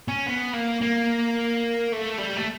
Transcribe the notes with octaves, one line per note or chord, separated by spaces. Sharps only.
C#4
B3
A#3
A#3
A3
G3
A3